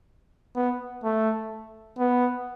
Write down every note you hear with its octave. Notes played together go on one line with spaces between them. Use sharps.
B3
A3
B3